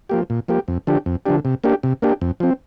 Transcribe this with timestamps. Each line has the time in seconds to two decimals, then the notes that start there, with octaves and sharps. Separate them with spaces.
0.09 F3 A#3 G4
0.30 A#2
0.48 F3 A#3 G4
0.68 F2
0.87 D3 F3 D4 G4
1.06 F2
1.26 D3 F3 D4 G4
1.45 C3
1.64 A#3 D4 G4
1.83 C3
2.02 A#3 D4 G4
2.21 F2
2.40 F3 C4